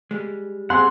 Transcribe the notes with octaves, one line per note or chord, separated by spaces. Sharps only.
G3 G#3
C4 G#4 F#5 C6